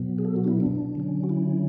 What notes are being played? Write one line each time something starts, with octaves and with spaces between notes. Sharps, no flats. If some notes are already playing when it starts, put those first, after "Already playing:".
Already playing: B2 F#3 B3
G#4
A4
F#4
D4
E4
D4
D3 F#3 C#4
F#4
E4